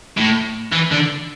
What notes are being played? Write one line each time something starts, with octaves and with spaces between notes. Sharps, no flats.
A2
E3
D3